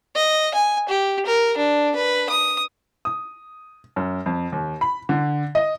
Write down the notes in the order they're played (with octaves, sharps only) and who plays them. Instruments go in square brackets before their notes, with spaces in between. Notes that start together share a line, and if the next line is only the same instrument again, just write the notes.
[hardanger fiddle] D#5
G#5
G4
A#4
D4
B4
D#6
[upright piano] D#6
F#2
F2
D#2
B5
D3
D#5